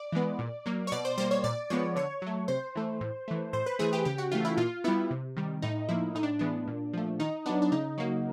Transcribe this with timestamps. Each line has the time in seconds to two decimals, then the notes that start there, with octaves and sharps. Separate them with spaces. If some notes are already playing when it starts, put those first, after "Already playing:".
Already playing: D5
0.12 E3 G#3 B3
0.39 A#2
0.66 F#3 A#3
0.87 C#5
0.92 B2 D5
1.05 C5
1.18 G3 A#3 C5
1.31 C#5
1.44 A#2 D5
1.70 F3 G#3 B3 C#5
1.96 D3 C#5
2.22 F#3 A3
2.48 C3 C5
2.75 E3 A3
3.01 A2
3.28 E3 A3
3.53 A2 C5
3.66 B4
3.79 E3 A3 G#4
3.93 G4
4.05 C#3 G4
4.18 F#4
4.32 E3 A3 F4
4.45 E4
4.57 A#2 F4
4.84 G3 B3 E4
5.11 C3
5.37 D#3 G3
5.62 A2 D#4
5.89 F3 A#3 E4
6.15 A2 D#4
6.23 D4
6.39 E3 G#3 B3 D4
6.68 A#2
6.93 F3 A3
7.19 D#3 D#4
7.46 F#3 B3 D4
7.62 D4
7.72 C#3 D#4
7.98 F#3 A#3